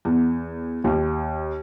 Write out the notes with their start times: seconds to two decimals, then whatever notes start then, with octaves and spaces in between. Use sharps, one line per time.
0.05 E2
0.84 D#2